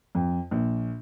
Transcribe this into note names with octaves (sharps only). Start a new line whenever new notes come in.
F2
A#1